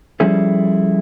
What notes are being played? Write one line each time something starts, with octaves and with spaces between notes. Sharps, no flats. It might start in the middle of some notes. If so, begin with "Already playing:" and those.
F3 G3 C#4 E4 G#4 A4